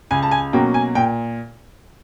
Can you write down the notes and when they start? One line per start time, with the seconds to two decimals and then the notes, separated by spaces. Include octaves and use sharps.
0.11 C#2 G#5
0.23 A5
0.31 G#5
0.53 B2 F#3 A#3 C#4 G5
0.74 G#5
0.95 A#2 G5